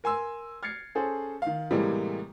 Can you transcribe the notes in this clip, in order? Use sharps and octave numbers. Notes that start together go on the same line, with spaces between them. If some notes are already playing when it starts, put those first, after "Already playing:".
A#4 G#5 C6 E6
F6 G#6 A6 C7 C#7
C#4 G#4 A4 C5
D#3 F5
A2 C3 E3 G3 G#3 A#3